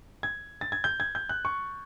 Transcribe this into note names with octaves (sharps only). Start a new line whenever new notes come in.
G#6
A6
G#6
G6
G#6
G6
F#6
C#6